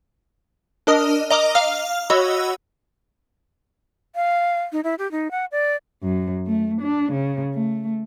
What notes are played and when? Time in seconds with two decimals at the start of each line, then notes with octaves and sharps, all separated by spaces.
0.87 D4 A#4 D#5 D#6 F6
1.30 D#5 A#5 D6 D#6 F6
1.55 F5 F6
2.10 F#4 C#5 D#5 F#5 B5 E6
4.16 F5
4.72 D#4
4.84 E4
4.99 G4
5.12 D#4
5.31 F#5
5.52 D5
6.03 F#2
6.47 A3
6.82 D4
7.12 C#3
7.54 A3